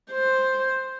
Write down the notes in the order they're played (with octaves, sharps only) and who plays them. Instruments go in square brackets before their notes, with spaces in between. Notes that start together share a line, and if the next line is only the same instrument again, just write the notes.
[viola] C5